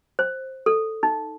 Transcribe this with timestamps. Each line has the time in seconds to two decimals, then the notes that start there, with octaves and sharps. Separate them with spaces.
0.19 C5
0.66 A4
1.03 D#4